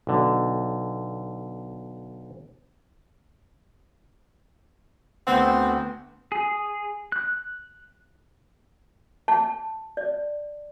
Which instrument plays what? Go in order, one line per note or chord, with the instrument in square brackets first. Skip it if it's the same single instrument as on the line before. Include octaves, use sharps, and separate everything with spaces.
[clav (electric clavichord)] B1 D3
[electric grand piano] D2 B3 F#5 [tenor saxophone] C4
[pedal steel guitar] G#4
F#6
[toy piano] A5
D5